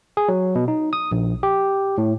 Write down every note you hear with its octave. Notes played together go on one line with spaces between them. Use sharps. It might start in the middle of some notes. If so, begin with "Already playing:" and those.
G#4
F#3
B2
D#4
D#6
A#1
G4
A2